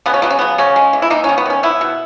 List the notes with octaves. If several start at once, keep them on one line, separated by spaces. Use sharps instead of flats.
C#3 B3
C#4
F#3 B3
C#4
C#3 B3
C#3 C#4
G#3
E3
E4
A#3 D#4
C#4
D#3
B3
D#3 C#4
B3 E4
B2